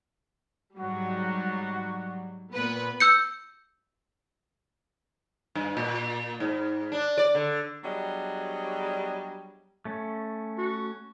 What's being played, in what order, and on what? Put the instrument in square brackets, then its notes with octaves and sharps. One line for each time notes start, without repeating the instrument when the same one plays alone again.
[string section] G#2 F#3 G3 [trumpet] F#4
[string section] A#2 B3 B4
[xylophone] E6 G6 C#7
[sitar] G2
A#2
G#2
D4
D5
D3
[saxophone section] F#3 G3 B3 D4 G#4 D#5
[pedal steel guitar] A3 C#4
[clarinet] F#4